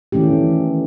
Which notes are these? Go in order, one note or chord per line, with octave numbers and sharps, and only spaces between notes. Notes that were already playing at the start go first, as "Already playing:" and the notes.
D#3 E3 A3 C#4 G4